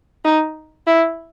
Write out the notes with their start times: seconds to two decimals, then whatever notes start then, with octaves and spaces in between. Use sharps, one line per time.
0.25 D#4
0.87 E4